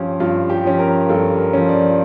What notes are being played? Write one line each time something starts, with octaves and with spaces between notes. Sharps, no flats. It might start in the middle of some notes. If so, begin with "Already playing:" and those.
Already playing: G2 F3 C#4 G4
G2 F4
G4
F3 C#4
A#4
G2 A4
A#4
F3 C#4
D5